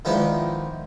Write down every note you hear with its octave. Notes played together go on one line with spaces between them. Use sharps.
D#3 F3 G#3 B3 D4 E4